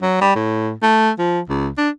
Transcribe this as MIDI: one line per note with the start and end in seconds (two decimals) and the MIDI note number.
0.02 0.17 54
0.21 0.34 55
0.36 0.72 45
0.82 1.10 57
1.18 1.40 53
1.49 1.69 37
1.78 1.90 62